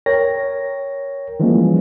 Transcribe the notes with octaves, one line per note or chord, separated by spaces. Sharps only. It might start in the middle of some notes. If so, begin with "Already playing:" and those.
A#4 C#5 G5 A#6
E3 F3 G3 G#3 A#3 C#4